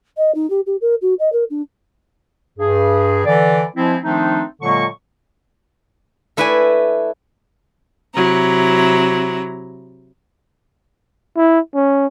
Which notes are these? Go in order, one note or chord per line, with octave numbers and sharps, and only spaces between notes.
D#5
D#4
G4
G4
A#4
F#4
D#5
A#4
D4
G2 G#4
D3 E3 D5
F3 G#3 C4 E4
D#3 F3 A3 C4 D4 D#4
A#2 D3 F#3 G#3 A#3 C#6
A3 E4 B4 D5 E5 G#5
C3 F#3 E4 A#5
E4
C#4